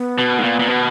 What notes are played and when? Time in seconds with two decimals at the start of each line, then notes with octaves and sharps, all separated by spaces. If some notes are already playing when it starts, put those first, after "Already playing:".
Already playing: B3
0.18 B2
0.39 G#2
0.44 A#2
0.59 A#2
0.68 B2